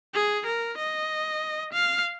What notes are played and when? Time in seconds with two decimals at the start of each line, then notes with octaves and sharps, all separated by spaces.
0.14 G#4
0.46 A#4
0.78 D#5
1.72 F5